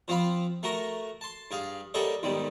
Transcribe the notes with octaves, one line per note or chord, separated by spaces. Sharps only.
F3 C4 F4 F5 B5
A3 F#4 A#4 A#5
A5 C6
G2 G#4 F5
G3 A#3 G#4 A4 C#5 D#5
B1 G#2 D#3 G3